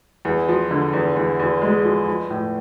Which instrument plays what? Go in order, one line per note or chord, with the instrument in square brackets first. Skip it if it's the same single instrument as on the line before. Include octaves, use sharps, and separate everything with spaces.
[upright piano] E2
F3
D3
E2
E2
E2
G#3
F3
F3
A2